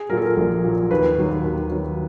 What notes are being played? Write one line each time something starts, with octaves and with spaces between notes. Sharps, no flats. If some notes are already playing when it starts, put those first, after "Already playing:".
Already playing: G#4
A#2 F#3 A#4
A4
A#4
A#1
A#2 F#3
D#2 B4
D#3 F#3
D#2
D#3 F#3